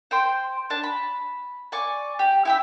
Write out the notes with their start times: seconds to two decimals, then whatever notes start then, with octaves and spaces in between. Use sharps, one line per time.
0.11 C5 G5 C6
0.70 D4 A5
0.83 B5
1.72 D5 G#5 C#6 D6
2.19 G4
2.45 E4 G4 E5